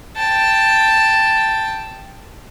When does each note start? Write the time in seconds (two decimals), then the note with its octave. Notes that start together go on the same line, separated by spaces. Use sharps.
0.17 G5 A5